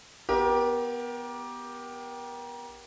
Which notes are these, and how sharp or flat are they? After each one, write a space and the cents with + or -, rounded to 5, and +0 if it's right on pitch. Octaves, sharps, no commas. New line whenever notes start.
B3 +0 G4 +0 A#4 +30